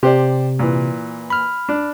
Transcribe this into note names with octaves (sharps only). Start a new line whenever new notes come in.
C3 G4 C5 D5
A#2 E3
B5 F6
D4